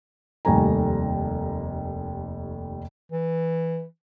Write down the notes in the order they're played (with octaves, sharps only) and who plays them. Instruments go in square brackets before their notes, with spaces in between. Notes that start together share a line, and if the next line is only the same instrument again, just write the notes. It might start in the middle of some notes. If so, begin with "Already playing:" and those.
[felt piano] F1 D#2 G3 A3 G#5 A#5
[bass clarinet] E3